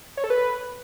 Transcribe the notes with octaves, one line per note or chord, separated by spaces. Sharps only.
C#5
A4
B4